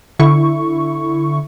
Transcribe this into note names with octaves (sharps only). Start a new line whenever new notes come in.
D3 E4 C#6